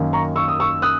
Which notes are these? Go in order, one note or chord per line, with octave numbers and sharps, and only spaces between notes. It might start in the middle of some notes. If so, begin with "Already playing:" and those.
Already playing: F#2 D#3 A#3
A#5 C#6
C#6 E6
D#6
C#6 E6
D#6 F#6